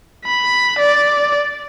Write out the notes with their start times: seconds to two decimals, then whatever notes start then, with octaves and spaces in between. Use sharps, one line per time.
0.25 B5
0.79 D5